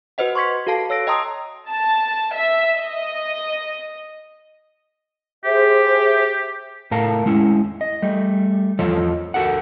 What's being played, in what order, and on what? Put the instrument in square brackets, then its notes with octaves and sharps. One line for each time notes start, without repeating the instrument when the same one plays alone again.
[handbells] F#4 B4 C5 D#5 F#5
C6 C#6 G#6 B6 C#7
F#4 A4 F5 A5 C7
C#5 E6 A#6 D7
D#5 G5 A5 A#5 C6 D#6
[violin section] A5
E5
D#5
[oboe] G4 [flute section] G#4 C5 E5
[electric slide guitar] A2 A4 A#4 F5 A5
G#3 C#4 E4
D#5
G3 A3
E2 F3 F4 A4 C#5 D#5
F#4 A4 A#4 F#5